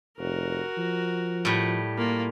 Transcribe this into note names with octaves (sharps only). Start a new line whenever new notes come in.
F1 F#4 A#4
F3
A2 G3
A#3 F4